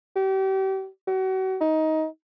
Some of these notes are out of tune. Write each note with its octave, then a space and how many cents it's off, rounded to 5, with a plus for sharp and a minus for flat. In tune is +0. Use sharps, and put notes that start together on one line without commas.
G4 -35
F#4 +35
D#4 +15